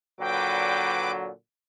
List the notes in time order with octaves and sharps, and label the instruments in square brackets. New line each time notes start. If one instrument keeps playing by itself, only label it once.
[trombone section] A#2 D3 F#3 [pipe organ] B4 D6 [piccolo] G5